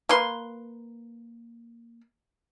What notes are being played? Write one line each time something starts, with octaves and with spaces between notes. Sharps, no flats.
A#3 B4 C6